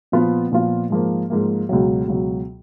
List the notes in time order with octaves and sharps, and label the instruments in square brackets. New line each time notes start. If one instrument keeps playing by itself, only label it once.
[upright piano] A#2 F3 B3 F4
A#2 F3 B3 F4
G#2 F3 A#3
G#2 F3 A#3
C#2 B2 F#3
C#2 B2 F#3